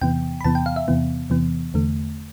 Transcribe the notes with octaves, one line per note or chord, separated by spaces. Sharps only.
E2 C3 E3 B3 G5
B5
E2 C3 E3 B3 A5
G5
F5
E5
E2 C3 E3 B3
E2 C3 E3 B3
E2 D3 A3